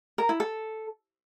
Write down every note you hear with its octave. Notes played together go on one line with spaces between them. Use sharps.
A#4
E4
A4